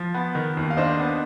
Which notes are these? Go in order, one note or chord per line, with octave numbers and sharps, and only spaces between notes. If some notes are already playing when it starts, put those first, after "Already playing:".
Already playing: F3
B3
D#3
D#2
F5
D4 C5 D#5
B3